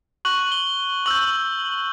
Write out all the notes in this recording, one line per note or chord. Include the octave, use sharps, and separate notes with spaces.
C#6 F#6 F#7
F#7
G7
C#6 E6 G6 F#7